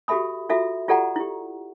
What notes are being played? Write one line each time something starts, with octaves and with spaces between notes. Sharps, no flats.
F#4 G4 A4 E5 B5 D#6
F4 F#4 A4 E5
F4 G4 A4 D5 F#5 A#5
E4 G4